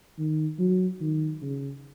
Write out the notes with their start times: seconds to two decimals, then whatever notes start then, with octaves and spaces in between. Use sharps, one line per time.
0.18 D#3
0.59 F#3
1.01 D#3
1.42 C#3